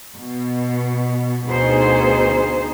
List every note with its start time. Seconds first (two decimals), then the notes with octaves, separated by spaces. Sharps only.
0.20 B2
1.48 D2 B2 D#4 G#4 C5